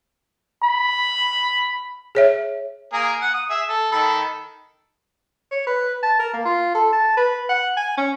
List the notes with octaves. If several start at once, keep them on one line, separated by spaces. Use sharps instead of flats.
B5
G#4 C#5 E5
A#3 G#4 A#4
F#5
D#6
G#4 E5
A4
D#3 A4 B5
C#5
B4
A5
A#4
A#3
F4
A4
A5
B4
F#5
G#5
C#4